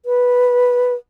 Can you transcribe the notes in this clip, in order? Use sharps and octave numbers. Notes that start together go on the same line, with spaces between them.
B4